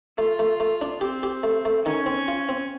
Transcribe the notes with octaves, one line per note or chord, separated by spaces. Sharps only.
A3 F4
A3
A3
D4
C4 G4
G4
A3
A3
D#3 C#4
C4
F4
C4